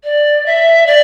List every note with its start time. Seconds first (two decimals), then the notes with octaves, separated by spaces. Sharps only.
0.04 D5
0.46 E5
0.87 D5